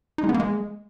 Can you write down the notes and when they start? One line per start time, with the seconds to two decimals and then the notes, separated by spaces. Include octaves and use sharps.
0.18 D#4
0.24 G#3
0.29 B3
0.34 A#3
0.40 G#3